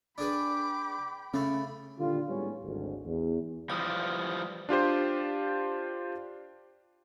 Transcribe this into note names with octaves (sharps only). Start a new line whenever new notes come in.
D4 G#4 B4 G5 B5 D6
C#3 A3 C#4 B5
A#2 D3 D#3 G3 F4
A2 G3 G#3 B3 C#4
G#1 D2
E2
E3 F3 G3 D#6
D4 F4 G4 C5